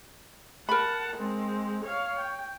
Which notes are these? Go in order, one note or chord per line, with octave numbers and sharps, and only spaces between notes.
A#4 F#5 A5 B5
G#3 C4
C#5 F5
G5